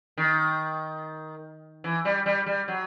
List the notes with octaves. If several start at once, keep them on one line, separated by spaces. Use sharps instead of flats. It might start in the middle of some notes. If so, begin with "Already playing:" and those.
D#3
E3
G3
G3
G3
F#3